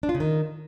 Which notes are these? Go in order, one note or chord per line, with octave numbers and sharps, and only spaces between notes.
D4
F4
C#3
D#3